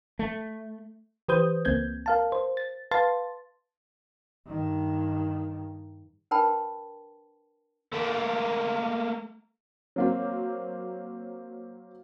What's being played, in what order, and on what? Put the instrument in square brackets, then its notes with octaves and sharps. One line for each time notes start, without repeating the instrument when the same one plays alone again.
[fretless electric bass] A3
[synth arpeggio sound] E3 G4 B4 C5 D#6 G6
C#2 A#3 C4 G6 G#6
A#4 F5 A5
C5
A6
B4 F5 A5 C6 A6
[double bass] G2 D#3
[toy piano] D4 A#4 B4 G5 A5 B5
[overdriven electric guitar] A3 A#3
[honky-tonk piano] F#3 A#3 C4